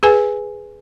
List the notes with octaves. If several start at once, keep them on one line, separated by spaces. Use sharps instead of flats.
G#4 B4 G#5